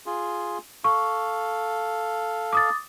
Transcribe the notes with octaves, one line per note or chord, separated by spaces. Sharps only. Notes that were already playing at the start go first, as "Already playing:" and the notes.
F4 G#4
A4 F5 C#6
D6 D#6 A6